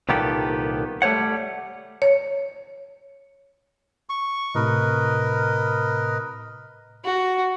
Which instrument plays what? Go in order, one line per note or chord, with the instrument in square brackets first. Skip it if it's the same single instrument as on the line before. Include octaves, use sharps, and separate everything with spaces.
[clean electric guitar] C2 A#2 D#3 B3 G4 A4
G3 A3 C5 C#5 F#5
[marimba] C#5
[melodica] C#6
[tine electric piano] A2 C3 [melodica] A#4 B4 D#5
[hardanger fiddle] F#4